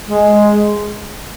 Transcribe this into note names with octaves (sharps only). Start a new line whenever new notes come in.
G#3